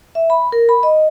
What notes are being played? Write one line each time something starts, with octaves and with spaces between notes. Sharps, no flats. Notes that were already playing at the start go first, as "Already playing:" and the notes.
E5
B5
A#4
B5
D#5